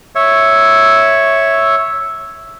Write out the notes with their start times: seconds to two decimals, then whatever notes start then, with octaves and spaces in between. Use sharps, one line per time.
0.15 C#5 E5